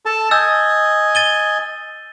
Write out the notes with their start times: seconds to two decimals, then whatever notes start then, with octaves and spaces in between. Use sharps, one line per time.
0.06 A4 A5
0.31 D#5 G#5 E6 G6 A6
1.15 A6 D#7 G7